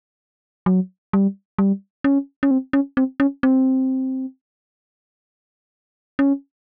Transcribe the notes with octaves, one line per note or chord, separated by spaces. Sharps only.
F#3
G3
G3
C#4
C#4
C4
C#4
C4
C#4
C4
C#4